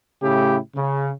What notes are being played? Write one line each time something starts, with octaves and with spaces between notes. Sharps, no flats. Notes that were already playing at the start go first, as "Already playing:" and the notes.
A2 C#3 A3 E4 G4
C#3